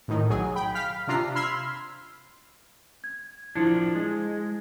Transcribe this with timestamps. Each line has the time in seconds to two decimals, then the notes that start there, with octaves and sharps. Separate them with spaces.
0.08 A2 D#3
0.30 B1 F#3 G#4
0.55 G5 B5
0.75 F5 F6 B6
1.07 C3 D4 F4 A#5 C7
1.35 B5 C6 E6 F6 G#6 C7
3.04 G#6
3.55 F3 D4 E4 G#6 C#7
3.95 G#3